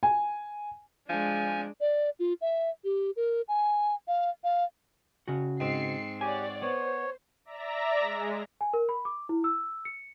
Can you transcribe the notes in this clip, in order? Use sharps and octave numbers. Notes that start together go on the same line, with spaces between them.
G#5
F3 G#3 D4 G#5
D5
F4
E5
G4
A#4
G#5
F5
F5
C#3 F#4
G#2 C4 C7 C#7
G4 C#5 D5 F#5 G#5
B3 C5 C#5
D5 E5 A#5 A#6
G#3
G#5
A#4
B5
D6
E4
E6
C#7